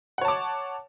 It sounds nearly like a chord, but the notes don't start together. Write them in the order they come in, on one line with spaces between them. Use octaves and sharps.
F#5 C#5 A5 D6